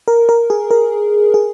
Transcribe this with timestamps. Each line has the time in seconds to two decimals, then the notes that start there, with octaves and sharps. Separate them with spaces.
0.08 A#4
0.29 A#4
0.50 G#4
0.71 A#4
1.34 G#4